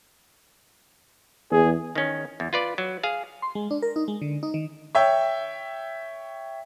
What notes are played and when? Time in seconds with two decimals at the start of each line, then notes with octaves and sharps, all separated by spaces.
1.51 E2 G#4
1.95 D#3 C#4
2.40 E2
2.53 F4 B4 D5
2.78 F#3
3.03 G#4 F5
3.42 C6
3.55 G#3
3.71 D4
3.82 A#4
3.96 D#4
4.08 G#3
4.22 D3
4.43 D#4
4.54 D#3
4.95 C#5 E5 G5